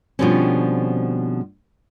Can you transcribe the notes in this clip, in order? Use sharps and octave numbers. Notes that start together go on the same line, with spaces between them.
B2 D3 F3 G3 C4 C#4